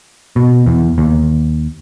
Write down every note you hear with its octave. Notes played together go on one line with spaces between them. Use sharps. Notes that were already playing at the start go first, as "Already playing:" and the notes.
B2
E2
D#2